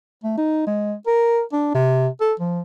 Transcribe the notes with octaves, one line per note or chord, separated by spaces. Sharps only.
A3
D#4
G#3
A#4
D4
C3
A4
F3